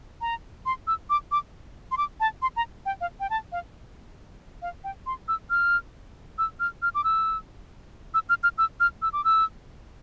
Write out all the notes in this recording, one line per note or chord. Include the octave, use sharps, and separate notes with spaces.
A#5
C6
E6
D6
D6
C6
D6
A5
C6
A#5
G5
F5
G5
A5
F5
F5
G5
C6
E6
F6
E6
F6
F6
D6
E6
E6
F6
F6
E6
F6
E6
D6
E6